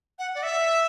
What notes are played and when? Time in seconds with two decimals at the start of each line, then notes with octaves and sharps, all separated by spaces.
0.19 F#5
0.35 D5
0.43 E5